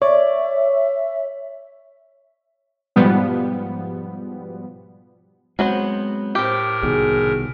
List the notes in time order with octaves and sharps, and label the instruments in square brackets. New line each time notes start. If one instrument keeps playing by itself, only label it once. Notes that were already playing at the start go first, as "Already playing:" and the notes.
[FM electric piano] C#5 [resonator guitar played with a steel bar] D5 [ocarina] E5
[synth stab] G#2 B2 F3 G3 B3
[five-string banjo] F#3 B3 C5 [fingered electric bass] G#3 C4
[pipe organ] A2 A#4 [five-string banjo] G4 C5
[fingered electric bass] C2 B2 D#3 [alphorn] G#4